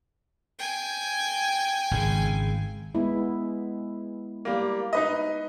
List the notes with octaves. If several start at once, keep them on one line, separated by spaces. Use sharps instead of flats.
G5 G#5
G#1 C#3
G#3 B3 E4
G3 A#3
D#4 B4 D#5